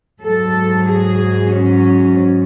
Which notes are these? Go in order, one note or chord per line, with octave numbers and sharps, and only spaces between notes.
G#2 F#3 A4
G#4
C#4